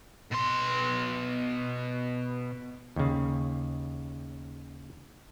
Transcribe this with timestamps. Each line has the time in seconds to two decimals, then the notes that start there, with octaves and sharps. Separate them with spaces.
0.31 B2 C6
2.96 D#2 C#3